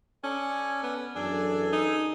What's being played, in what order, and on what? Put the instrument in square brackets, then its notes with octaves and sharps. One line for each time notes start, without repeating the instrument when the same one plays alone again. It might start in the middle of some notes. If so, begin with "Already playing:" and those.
[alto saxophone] C#4 [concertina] A4 D5 G#5
[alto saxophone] B3
[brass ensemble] F#2 E3 A4 [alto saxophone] D4 [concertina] G#4 G#5 E6
[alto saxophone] D#4